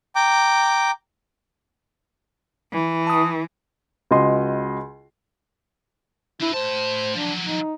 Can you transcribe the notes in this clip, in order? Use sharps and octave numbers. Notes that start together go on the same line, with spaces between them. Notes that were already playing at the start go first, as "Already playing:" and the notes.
G5 A#5 D6
E3
A5 D#6
C#2 F#4 D#5 C6
D4 E4 B4
A2 C5 A5
F3 F#3 D4
D#4